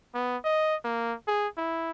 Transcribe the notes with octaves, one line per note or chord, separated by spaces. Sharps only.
B3
D#5
A#3
G#4
E4